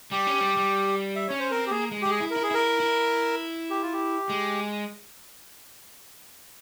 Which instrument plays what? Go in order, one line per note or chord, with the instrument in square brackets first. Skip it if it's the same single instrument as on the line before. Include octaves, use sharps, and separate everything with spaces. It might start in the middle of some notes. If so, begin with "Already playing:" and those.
[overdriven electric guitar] G3 [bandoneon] G4
[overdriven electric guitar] C#4
G3
G3
[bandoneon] E5
[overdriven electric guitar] C#4 [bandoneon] C#5
[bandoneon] C5
[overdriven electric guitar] C4 [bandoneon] A#4
[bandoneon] G4
[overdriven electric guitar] A#3 [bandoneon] G#4
[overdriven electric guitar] G#3
[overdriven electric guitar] G#3 [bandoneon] G4
[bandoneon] G#4
[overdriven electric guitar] E4
[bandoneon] A#4
[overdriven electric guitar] E4
[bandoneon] G#4
[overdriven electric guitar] E4 [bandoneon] A#4
[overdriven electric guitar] E4
[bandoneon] G4
F4
G4
[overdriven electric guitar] G#3